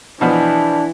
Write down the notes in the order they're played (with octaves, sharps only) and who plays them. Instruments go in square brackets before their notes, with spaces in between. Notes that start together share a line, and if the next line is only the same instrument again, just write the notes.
[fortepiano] B2 F3 B3 [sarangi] E3 [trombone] D4